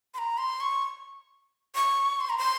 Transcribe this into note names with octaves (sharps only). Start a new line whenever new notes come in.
C6
A#5
C6
C#6
C#6
C6
A#5
C6